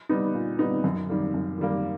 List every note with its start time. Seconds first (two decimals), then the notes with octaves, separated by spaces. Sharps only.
0.09 G3 B3 D#4
0.34 A#2
0.59 G3 B3 D#4
0.84 F#2
1.09 D#3 G3 A#3
1.34 F#2
1.58 D#3 G3 A#3